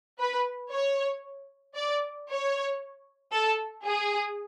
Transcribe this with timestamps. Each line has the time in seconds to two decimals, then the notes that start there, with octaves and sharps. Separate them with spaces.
0.19 B4
0.71 C#5
1.75 D5
2.28 C#5
3.33 A4
3.84 G#4